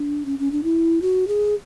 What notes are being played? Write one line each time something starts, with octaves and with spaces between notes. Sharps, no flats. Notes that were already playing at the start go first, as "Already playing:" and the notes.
Already playing: D4
C#4
C#4
D4
E4
F#4
G#4